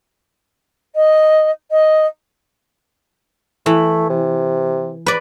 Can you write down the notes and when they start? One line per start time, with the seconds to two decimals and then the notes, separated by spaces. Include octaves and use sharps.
0.95 D#5
1.70 D#5
3.66 E3 A3
4.10 C3
5.06 B4 D5